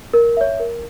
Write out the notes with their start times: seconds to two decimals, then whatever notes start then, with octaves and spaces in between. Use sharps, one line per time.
0.13 A#4
0.37 C#5 E5
0.60 A#4